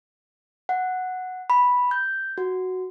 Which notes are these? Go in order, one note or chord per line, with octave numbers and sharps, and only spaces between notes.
F#5
B5
G6
F#4